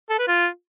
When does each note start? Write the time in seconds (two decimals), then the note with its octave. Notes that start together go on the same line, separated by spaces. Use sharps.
0.09 A4
0.19 B4
0.28 F4